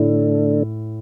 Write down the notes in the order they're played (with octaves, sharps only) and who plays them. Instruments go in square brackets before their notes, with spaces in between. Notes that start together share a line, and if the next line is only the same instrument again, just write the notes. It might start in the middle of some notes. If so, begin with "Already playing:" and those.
Already playing: [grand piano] A2 [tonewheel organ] D3 A3 D4